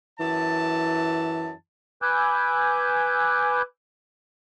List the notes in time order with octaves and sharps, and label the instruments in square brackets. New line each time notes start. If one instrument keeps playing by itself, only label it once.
[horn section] F#2 A5 [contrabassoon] E3
[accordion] B4 G#5 D6 E6 F#6 G6